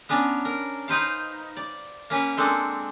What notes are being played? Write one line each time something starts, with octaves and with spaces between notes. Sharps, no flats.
B3 C#4 D4 A#5
A#4
D#4 B4 C5 F5
D5
A#3 C#4 B4 C#5
G#3 A#3 C4 D4 A4